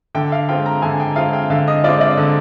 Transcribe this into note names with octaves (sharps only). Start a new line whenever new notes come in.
D3 G5
F5
G#3 C4 F4 G5
A#5
D3 G#5
G5
G#3 C4 F4 F5
G5
D3 F5
D#5
G#3 C4 F4 D5
D5
D3